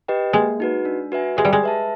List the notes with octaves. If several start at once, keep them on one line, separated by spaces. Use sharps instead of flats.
G4 B4 D#5 G5
G#3 A#3
D#4 F#4 B4
D4
F#4 B4 E5 G#5
G#3 G4
G3
G#3
B4 E5 A5